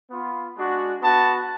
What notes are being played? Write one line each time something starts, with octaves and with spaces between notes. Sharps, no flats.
B3 F4
G#3 D4 F#4
B3 F#4 A5